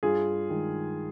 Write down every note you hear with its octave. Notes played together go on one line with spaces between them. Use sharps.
G2 F4 G#4
D#3 G#3